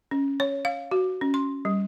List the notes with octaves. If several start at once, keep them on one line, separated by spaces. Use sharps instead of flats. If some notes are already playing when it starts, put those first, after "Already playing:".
C#4
C#5
F5
F#4
C#4
C6
G3